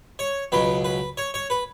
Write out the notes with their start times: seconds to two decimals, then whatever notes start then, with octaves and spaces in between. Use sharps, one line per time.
0.19 C#5
0.52 C#2 B2 F#3 B4
0.84 B4
1.17 C#5
1.34 C#5
1.50 B4